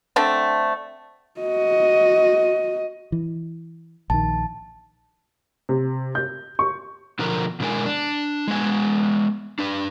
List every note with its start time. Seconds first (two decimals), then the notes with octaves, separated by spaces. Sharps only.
0.16 D3 A3 C4
1.41 F#4 D#5
3.12 E3
4.10 A#1 D#3 A5
5.69 C3
6.15 G6
6.59 C#6
7.19 B2 D3 F3 A#4
7.60 B2 D3 G#3 E4 A#4 G#5
7.86 D4
8.48 G#3 B3 G#5
9.59 D4 B4